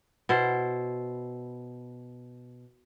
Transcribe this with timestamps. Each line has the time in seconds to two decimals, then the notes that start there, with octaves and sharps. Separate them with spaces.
0.29 B2 E4 C5